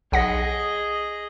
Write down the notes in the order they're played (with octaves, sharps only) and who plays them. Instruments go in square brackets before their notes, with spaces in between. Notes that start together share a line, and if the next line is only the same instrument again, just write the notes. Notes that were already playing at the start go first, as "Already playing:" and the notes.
[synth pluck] B1 F#5 A#6 [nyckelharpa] G#4 D#5